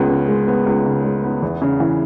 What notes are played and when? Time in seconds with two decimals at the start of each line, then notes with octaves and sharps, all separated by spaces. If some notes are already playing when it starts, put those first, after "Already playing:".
Already playing: C#2 G#3 B3
0.10 C#3
0.28 G#3
0.48 B3
0.66 C#2
0.86 C#3
1.04 G#3
1.24 B3
1.42 E2
1.62 C#3
1.80 E3